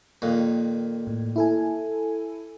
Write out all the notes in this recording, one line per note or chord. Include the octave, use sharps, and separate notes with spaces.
F2 A#2 D#3
A2
E4 A4 G#5